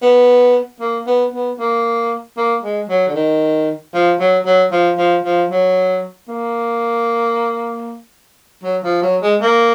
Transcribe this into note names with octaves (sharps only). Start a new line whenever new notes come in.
B3
A#3
B3
B3
A#3
A#3
G#3
F#3
D3
D#3
F3
F#3
F#3
F3
F3
F3
F#3
A#3
F#3
F3
F#3
G#3
A#3